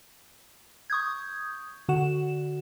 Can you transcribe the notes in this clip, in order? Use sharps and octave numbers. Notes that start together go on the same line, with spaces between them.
C#6 D#6 G6 G#6
D3 F#4 F#5 E7